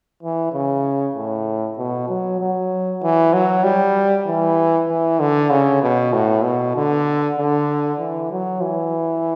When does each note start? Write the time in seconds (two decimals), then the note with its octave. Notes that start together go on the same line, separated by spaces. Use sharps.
0.23 E3
0.53 C#3
1.15 A2
1.78 B2
2.09 F#3
2.40 F#3
3.03 E3
3.33 F#3
3.64 G3
4.27 E3
4.89 E3
5.20 D3
5.51 C#3
5.82 B2
6.13 A2
6.44 B2
6.76 D3
7.38 D3
8.00 E3
8.32 F#3
8.62 E3